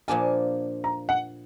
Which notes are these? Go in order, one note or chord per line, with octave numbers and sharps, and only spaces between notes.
A#2 F3 A#3 D4 F4 G#5
A#5
F#5